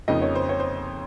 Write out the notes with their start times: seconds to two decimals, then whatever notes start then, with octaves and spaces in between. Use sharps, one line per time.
0.08 F2 C#3 F3 A#3 D#4 D#5
0.22 C#5
0.35 C5
0.49 C#5
0.60 C5